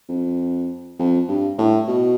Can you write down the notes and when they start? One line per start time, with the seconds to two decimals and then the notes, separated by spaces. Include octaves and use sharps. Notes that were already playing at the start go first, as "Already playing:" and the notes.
0.09 F2
0.99 F2
1.29 G2
1.58 A2
1.88 B2